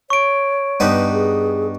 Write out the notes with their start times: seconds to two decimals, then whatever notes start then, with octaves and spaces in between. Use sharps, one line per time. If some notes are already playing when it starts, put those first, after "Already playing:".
0.10 C#5 C#6 D7
0.80 G2 B3 D#4
1.13 G#4